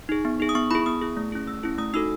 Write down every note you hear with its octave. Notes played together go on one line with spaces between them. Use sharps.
D#4 G#4
B3
D#4 G#4
D#6
B3 C#6
E4 G#4 B5
B3 D#6
E4 G#4
A3
C#4 E4 G#4
A3 E6
C#4 E4 G#4
A3 D#6
D#4 F#4 A4 E6